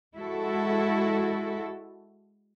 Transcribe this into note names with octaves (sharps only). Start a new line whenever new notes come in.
G#3 E4 F#4 A4